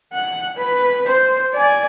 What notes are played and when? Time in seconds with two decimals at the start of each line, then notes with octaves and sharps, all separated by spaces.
0.13 F#5
0.57 B4
1.07 C5
1.53 D5 G#5